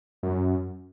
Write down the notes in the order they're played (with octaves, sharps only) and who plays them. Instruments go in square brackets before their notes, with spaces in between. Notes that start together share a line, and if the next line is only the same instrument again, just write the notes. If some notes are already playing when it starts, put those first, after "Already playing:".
[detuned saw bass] F#2